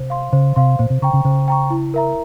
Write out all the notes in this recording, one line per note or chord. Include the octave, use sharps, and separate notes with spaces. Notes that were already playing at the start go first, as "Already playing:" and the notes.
Already playing: C3 C5
F5 C6
C#3 C5
C3 F5 C6
A#2 C5
C3
C#3 G5 A#5 C#6
C#3
C#3 C5
G5 A#5 C#6
E4
A#4 E5 A#5